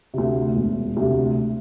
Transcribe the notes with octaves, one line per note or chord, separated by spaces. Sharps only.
D2 C3
E1
D2 C3